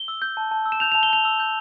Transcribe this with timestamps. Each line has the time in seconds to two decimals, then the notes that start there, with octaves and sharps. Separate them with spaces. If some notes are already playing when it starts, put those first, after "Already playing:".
Already playing: G7
0.08 E6
0.22 G6
0.37 A5
0.51 A5
0.66 E6
0.72 E7
0.80 G6 F7
0.92 F7
0.95 A5
1.03 G7
1.10 A5 F7
1.25 E6
1.40 G6